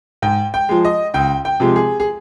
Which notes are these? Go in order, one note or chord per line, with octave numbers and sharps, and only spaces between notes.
G#2 G5
G5
F3 G#3
D#5
C#2 G5
G5
C3 F3 G#3
G#4
G#4